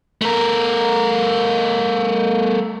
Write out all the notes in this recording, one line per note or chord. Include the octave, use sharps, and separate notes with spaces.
A3 A#4